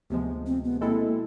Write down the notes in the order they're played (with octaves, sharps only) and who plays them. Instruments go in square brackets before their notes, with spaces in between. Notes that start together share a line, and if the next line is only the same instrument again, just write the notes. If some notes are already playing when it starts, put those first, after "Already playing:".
[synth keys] D2 C3 F3 G#3 [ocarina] B3
[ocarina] C4
B3
[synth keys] B2 G#3 C4 E4 A4 [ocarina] A#3